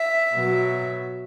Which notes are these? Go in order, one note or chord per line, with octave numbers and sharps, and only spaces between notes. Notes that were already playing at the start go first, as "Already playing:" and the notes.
Already playing: E5
B2 F#3